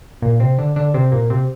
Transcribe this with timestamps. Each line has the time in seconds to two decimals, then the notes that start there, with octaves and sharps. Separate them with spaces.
0.22 A#2 A#3
0.40 C3 C4
0.58 D3 D4
0.76 D3 D4
0.94 C3 C4
1.12 A#2 A#3
1.30 C3 C4